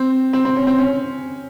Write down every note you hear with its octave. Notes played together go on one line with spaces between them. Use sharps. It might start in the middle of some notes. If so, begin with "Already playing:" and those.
Already playing: C4
C4
C4
C#4
C4
C#4